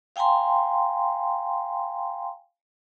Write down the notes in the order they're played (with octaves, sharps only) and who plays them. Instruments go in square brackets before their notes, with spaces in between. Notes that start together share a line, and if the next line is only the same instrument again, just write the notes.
[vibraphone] F5 G5 G#5 A#5 C6